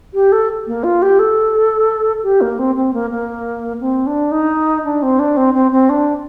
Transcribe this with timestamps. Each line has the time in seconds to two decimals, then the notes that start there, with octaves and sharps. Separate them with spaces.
0.14 G4
0.32 A4
0.67 A#3
0.84 F4
1.02 G4
1.19 A4
2.23 G4
2.41 A#3
2.59 C4
2.75 C4
2.94 A#3
3.10 A#3
3.81 C4
4.07 D4
4.32 D#4
4.85 D4
5.02 C4
5.19 D4
5.37 C4
5.54 C4
5.72 C4
5.89 D4